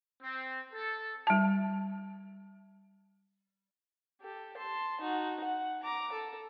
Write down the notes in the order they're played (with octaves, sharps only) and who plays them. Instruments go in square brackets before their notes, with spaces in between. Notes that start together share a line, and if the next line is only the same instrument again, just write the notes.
[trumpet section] C4
A4
[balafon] G3 A5
[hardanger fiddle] G4 A4
A5 C6
D#4 F#4
F#5
A#5 D6
A4